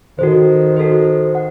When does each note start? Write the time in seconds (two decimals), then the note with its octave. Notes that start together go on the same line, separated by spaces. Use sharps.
0.19 D#3 F#4 A4 C5
0.77 F#4 A4 C5
1.35 F#5